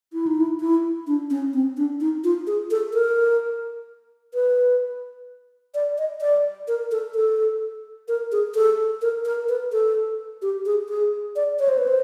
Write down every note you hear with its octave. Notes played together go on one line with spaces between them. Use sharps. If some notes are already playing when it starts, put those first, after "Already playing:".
E4
D#4
E4
E4
D4
C#4
C4
D4
D#4
F4
G#4
A4
A#4
B4
D5
D#5
D5
A#4
A4
A4
A#4
G#4
A4
A#4
A#4
B4
A4
G4
G#4
G#4
D5
C#5
C5
B4
C5